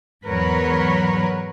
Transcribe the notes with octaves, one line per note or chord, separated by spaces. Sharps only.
E2 G#2 F#3 A#4 B4 C#5